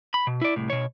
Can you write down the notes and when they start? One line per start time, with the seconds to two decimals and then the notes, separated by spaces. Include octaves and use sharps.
0.14 B5
0.27 B2
0.41 E4 D5
0.56 C2 A2
0.70 B2 C#5